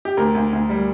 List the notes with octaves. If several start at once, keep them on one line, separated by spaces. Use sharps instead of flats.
G4
D2 A#4
D2
D2
G3